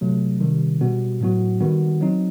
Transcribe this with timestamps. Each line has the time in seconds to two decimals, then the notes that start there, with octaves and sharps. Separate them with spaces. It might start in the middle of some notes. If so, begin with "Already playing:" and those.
0.01 C3 F#3 A3
0.41 C3 D#3 G3
0.81 B2 G3 B3 F#4
1.21 A2 F#3 B3 F#4
1.61 D#3 G3 B3 F#4
2.01 F#3 C4 D#4